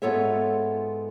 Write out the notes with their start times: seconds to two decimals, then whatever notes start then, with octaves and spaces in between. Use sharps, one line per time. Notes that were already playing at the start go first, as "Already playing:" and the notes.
0.02 G#2 B3 F4 A4 C#5 E5